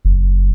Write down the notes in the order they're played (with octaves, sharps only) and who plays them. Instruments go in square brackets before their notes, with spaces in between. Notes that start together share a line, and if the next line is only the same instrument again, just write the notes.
[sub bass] F#1